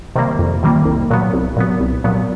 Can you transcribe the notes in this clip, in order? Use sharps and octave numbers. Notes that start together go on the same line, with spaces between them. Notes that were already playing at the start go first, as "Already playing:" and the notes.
C3 D#3 G3 A#3
F2
C3 D#3 G3 A#3
C2
A#2 F#3 B3
C2
A#2 F#3 B3
C2
A#2 F#3 B3